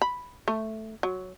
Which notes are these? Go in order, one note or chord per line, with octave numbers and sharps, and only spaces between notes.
B5
A3
F#3